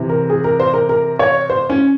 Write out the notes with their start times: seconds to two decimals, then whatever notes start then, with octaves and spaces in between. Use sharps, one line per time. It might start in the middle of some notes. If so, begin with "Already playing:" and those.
Already playing: C3 E3
0.09 A#4
0.30 G#4
0.44 A#4
0.60 C5
0.74 A#4
0.89 A#4
1.19 C#5
1.50 C5
1.70 C#4